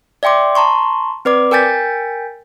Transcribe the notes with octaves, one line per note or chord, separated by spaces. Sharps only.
D5 E5 G5 C6 D6
A5 A#5 C6 C#6
C4 B4 D5 D6
A#4 G5 G#5 G6 A6 B6